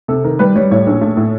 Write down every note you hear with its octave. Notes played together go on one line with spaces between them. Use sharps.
C3 A4
D#3 A#4
G3 B4
G3 C#5
A2 C#5
A#1
A3
A2